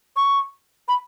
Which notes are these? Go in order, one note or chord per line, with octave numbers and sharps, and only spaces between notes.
C#6
B5